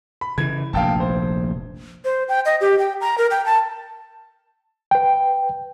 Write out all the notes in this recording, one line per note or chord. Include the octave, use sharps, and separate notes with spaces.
B5
C#3 E3 G#6
F1 A#1 A#3 F5 G5 A5
C5
C5
G5
D#5
G4
G5
A#5
A#4
G5
A5
B4 G5